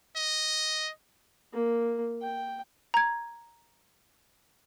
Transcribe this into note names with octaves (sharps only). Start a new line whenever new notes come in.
D#5
A#3
G5
A#5 G#6